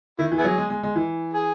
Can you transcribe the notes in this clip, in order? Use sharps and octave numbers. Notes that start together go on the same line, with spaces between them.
D#3 E4
E3
B3 E4 G#4
F#3
G#3
G#3
G#3
E3
G#4